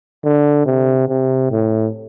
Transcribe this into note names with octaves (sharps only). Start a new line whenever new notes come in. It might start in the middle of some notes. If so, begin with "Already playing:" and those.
D3
C3
C3
A2